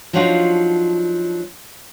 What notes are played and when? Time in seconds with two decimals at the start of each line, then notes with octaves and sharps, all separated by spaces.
0.13 F3 F#3 D4 D#4 F4 F#4